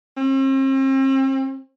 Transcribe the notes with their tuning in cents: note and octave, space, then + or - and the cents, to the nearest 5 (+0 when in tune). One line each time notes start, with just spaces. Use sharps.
C4 +40